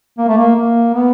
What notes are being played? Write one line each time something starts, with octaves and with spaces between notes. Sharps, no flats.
A#3
A3
A#3
A#3
B3